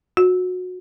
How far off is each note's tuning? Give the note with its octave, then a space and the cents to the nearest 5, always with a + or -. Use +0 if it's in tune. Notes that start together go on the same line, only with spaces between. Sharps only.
F#4 -25